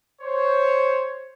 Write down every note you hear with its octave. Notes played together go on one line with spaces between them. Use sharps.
C5 C#5